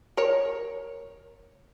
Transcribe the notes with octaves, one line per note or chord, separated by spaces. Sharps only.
A#4 C#5